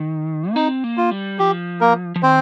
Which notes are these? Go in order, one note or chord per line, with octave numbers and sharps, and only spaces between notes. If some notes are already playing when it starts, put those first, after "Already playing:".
Already playing: D#3
A#3
C4 D#4
A#3
F4
G3
F3 G4
A#3 A#4
F3
D#3 C4 C5